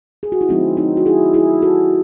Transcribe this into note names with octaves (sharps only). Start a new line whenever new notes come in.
G#4
F#4
E4
D#3 F#3 A3 C4 D#4
C4 D#4
F#4
E4 G#4
E4 G#4
F#4 A4